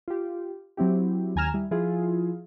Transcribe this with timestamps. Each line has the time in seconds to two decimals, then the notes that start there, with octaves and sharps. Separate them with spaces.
0.08 F4 G4
0.77 F#3 C4 E4 G4
1.36 D#2 G#5 A#5 F6 E7
1.54 G3 E4
1.71 F3 E4 F4 G#4